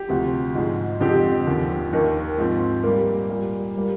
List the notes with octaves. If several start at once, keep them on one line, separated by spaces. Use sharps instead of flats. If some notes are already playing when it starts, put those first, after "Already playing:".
Already playing: G4
D2 C3 F3 C4
G#2 F3 G#3
F2 D3 F3 G#3 C4 G4
D#2 D3 F3
D#2 D#3 A#3
G#2 F3 C4
A#2 G3 A#3 A#4
A#2 G3 A#3
G3 A#3